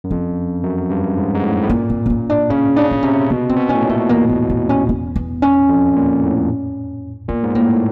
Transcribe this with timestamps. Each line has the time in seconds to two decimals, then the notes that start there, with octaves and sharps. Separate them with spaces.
0.04 F#2
0.11 F2 C#4
0.63 F#2
0.90 G2
1.18 G#2
1.35 G#2
1.43 A2
1.63 A2
1.70 A#2 C#4
1.90 C4
2.06 C4
2.10 C#4
2.30 D4
2.50 C#3 C#4
2.76 C#3 D4
2.91 D4
3.03 C3 C#4
3.30 B2 C#4
3.49 C4
3.57 B2
3.69 A2 C#4
3.82 A#2
3.89 A3
4.09 E2 A#3
4.29 B3
4.50 C4
4.69 C#4
4.89 C#4
5.16 B3
5.42 C#4
5.69 F2
5.96 A#2
6.23 A2
7.28 A#2 B3
7.43 G#2
7.55 A2 A#3